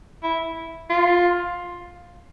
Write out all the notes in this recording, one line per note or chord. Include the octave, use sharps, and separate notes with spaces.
E4
F4